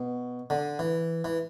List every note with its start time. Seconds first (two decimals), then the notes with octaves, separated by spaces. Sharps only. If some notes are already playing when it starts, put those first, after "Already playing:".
Already playing: B2
0.50 D3
0.79 E3
1.24 E3